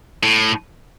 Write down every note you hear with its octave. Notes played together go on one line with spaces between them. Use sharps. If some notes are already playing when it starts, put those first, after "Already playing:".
A2